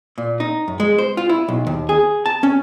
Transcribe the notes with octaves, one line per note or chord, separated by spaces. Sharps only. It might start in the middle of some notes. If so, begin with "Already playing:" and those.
A#2
D#4
F#2
G#3
C5
F4
E4
B1
D#2
G#4
A5
C#4